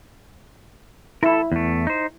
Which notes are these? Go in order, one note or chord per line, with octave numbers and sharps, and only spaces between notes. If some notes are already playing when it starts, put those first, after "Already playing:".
E4 A4 A#4
E2 A3
D#4 C5